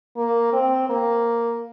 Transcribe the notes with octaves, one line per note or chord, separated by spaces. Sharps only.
A#3
C4
A#3